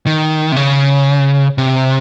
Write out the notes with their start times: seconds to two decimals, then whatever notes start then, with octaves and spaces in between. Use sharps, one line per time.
0.06 D#3
0.52 C3
0.56 C#3
1.58 C3